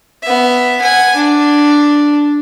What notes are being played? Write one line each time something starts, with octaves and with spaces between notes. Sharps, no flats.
B3 E5
F#5 G#5
D4